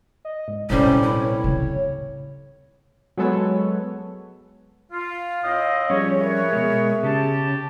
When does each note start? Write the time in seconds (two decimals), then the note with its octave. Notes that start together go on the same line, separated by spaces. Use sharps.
0.25 D#5
0.48 G#2
0.70 A#1 A2 C3 G3 C#4
1.02 E4 B4
1.22 C#5
1.44 D2 C#3
3.17 F#3 G#3 B3 A4 B4 C#5
4.91 F4 F5
5.43 A2 C4 D#5
5.90 F3 G3 C#4 G#4 C#5
6.20 A#4 B4 C#5 E5
6.53 B2 G#3
7.03 C#3 G4 A5